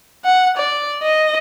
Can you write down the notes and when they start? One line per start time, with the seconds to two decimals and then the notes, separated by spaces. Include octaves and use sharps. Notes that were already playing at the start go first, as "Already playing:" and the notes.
0.25 F#5
0.57 D5
1.03 D#5